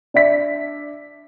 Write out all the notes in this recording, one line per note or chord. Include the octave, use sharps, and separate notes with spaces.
D4 D5 E5 B6